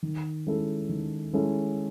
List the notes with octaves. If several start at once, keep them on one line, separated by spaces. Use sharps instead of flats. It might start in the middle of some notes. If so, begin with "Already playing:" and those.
D#3
G#3 C#4 E4 A4
D#3
G#3 C#4 E4 A4